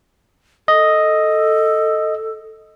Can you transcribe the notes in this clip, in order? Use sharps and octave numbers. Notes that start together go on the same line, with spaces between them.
A4 D#5